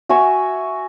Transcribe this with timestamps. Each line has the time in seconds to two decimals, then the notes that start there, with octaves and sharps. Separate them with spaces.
0.09 F#4 E5 G#5 C#6